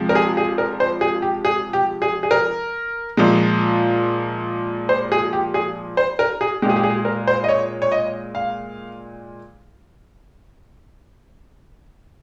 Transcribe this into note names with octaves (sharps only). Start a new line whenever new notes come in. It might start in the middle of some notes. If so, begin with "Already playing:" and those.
Already playing: C3 F3 G#3
A#4
G#4
G#4
A#4
C5
G#4
G4
G#4
G4
G#4
G#4
A#4
A#2 F3 G#3
C5
G#4
G4
G#4
C5
A#4
G#4
A#2 G#3 G4 G#4
G4
G#4
A#4
C5
D#5
C#5
C#5
D#5
F5